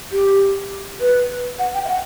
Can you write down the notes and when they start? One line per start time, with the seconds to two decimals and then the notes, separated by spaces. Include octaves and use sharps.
0.12 G4
1.01 B4
1.59 F#5
1.74 G5
1.85 E5
1.88 F#5